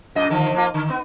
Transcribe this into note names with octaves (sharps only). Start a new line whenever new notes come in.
F#2 A#2 D#5
D3 D#3 F3
F3 A#3 F4
D3
B3